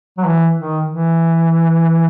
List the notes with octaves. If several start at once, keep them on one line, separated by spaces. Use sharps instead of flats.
F#3
E3
D#3
E3